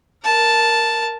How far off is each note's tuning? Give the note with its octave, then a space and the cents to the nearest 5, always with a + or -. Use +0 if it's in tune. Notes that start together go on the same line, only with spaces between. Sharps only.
A#4 +0 A5 +0